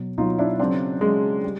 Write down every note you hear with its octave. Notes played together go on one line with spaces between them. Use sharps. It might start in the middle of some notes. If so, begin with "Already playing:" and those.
Already playing: B2 F#3
B2 F#3 D#4 F4
D4 E4
C#3 F#3 C4 D4
C#3 F#3 G#3
G3